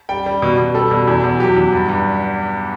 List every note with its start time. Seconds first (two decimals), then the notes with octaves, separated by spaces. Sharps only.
0.09 G3 G5
0.26 G3
0.42 B2
0.58 B2
0.74 G3 A4
0.91 B2
1.07 E2
1.24 E2
1.39 F#3 G4
1.56 E2
1.72 G2
1.89 G2